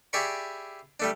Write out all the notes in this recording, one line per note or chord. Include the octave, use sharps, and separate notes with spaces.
E4 G4 G#4 D5 B5 C#6
G3 A3 D4